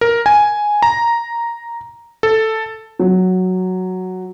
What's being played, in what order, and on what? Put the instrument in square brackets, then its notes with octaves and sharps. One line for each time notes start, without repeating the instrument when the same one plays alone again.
[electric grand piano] A#4
G#5
A#5
A4
[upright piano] F#3